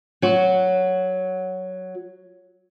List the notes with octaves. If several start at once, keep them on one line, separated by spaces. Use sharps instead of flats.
F#3 F#4